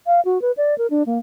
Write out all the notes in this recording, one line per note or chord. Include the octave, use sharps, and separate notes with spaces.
F5
F#4
B4
D5
A#4
D4
A#3